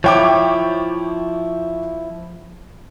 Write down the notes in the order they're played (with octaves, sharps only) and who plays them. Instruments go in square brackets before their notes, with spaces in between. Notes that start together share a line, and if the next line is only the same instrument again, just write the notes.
[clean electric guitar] F3 E4 [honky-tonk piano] C#5 G5 D6